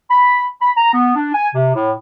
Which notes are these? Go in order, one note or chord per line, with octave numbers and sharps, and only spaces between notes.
B5
B5
A#5
B3
D4
G#5
C3
A2